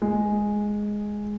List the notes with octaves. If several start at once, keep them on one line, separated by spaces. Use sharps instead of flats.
G#3